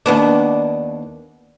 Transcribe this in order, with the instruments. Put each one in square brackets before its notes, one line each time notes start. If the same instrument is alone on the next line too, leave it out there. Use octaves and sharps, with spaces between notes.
[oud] D#2 B3 D4